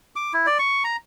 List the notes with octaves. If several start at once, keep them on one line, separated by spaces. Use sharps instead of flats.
D6
E4
D5
C#6
A#5